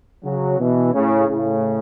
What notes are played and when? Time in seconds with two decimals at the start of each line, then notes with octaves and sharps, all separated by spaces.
0.24 C#3 F#3
0.59 B2 E3
0.93 A2 C#3
1.28 A2 C#3